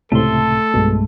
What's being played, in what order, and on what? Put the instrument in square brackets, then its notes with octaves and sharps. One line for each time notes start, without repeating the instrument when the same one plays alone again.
[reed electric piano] C#2 A2 C3 [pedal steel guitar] A3 C6 [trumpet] A4
[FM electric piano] B1 G2 G#3 [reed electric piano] B2